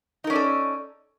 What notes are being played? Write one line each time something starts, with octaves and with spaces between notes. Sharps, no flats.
C#4 D#4 A4 A#4 D5